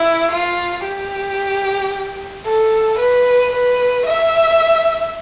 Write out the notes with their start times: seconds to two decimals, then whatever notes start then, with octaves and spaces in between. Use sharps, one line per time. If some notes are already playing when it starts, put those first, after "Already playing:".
Already playing: E4
0.31 F4
0.85 G4
2.46 A4
2.99 B4
3.53 B4
4.06 E5